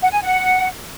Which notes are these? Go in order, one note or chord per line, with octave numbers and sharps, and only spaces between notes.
F#5
G#5
F#5